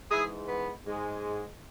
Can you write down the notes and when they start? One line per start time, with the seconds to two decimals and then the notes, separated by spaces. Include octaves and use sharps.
0.11 G#2 E3 G#3 E4 G#4
0.48 B3
0.86 G#2 G#3